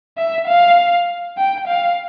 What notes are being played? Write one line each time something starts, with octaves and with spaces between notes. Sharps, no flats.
E5
F5
G5
F5